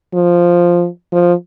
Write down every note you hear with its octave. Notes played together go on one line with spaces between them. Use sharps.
F3
F3